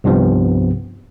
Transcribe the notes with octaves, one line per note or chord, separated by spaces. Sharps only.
C2 G2 C3 F3 B3